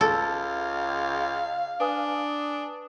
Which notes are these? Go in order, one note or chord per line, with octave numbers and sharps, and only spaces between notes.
C#2 A4 F5
D4 B4 G#5 D#6